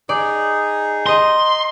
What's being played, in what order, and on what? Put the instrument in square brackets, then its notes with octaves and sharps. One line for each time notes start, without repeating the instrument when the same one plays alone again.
[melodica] D#4 G#4 [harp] D5
[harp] D#5 A#5 [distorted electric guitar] C6